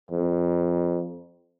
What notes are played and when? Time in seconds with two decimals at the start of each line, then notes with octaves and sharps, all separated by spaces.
0.11 F2